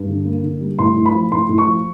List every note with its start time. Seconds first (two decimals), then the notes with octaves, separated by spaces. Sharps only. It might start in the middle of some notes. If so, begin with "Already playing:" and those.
Already playing: G2
0.09 D3
0.25 A#3
0.43 D3
0.61 G3
0.79 A2 C6
0.96 A2
1.06 B5
1.15 F3
1.32 A2 C6
1.49 A2
1.58 C#6
1.67 F3